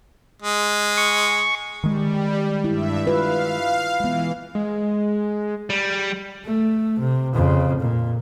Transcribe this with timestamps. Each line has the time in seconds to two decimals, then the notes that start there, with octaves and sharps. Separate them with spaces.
0.42 G#3
0.97 C#6
1.84 D#3 G3 G#3
2.64 G2 E4 E5
3.06 F4 B4 F5
4.00 E3 G#3 B3
4.55 G#3
5.70 G3
6.45 A3
6.99 C3
7.34 F2 C#3
7.80 A#2